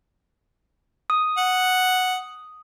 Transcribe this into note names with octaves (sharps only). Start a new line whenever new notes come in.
D#6
F#5